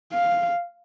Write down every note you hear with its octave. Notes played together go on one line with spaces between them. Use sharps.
F5